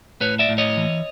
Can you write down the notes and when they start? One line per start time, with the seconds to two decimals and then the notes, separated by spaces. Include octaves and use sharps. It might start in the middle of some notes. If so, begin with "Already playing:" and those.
0.21 A2 B4 C#5
0.39 D5 E5
0.49 A2
0.58 C#5 D#5
0.77 E3